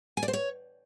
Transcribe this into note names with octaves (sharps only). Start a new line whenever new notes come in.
G#5
D5
C5
C#5